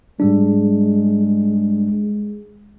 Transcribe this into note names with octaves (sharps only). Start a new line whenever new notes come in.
G#2 G3 G#3 D4